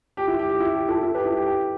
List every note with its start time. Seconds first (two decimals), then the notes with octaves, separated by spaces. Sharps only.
0.17 G4
0.27 E4
0.39 G4
0.49 G4
0.60 E4
0.74 G4
0.88 E4 A4
1.03 E4 A4
1.14 G4 B4
1.24 E4 A4
1.35 G4
1.46 G4